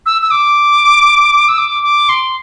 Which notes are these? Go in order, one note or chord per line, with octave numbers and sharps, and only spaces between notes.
E6
E6
D6
E6
D6
D6
C6